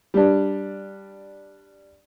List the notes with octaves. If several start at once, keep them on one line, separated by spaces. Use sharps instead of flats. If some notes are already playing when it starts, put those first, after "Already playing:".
G3 D4